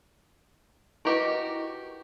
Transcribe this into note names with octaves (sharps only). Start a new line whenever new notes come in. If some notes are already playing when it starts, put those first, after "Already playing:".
E4 F#4 G4 A#4 B4 D#5